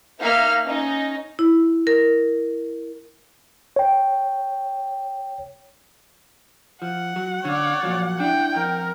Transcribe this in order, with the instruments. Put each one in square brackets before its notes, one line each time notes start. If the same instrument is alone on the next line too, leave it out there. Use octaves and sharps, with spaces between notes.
[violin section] A#3 D#4 E5 F5 F6
C#4 D#4
[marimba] E4
A#4
[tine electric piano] C#5 G5
[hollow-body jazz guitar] F3 [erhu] F#5
[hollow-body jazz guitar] F#3
[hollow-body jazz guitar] D3 [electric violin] C#5 D5
[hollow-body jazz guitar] A#2 F3 F#3
[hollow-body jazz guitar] D4 E4 [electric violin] G5
[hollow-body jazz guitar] F2 [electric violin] A#4